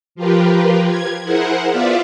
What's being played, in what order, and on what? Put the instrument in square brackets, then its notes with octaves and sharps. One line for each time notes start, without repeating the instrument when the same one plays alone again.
[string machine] F3 F4 G4 A#4 B4
G#6
E4 G#4 A#4 C5 F#5
B3 F4 D5 E5 F5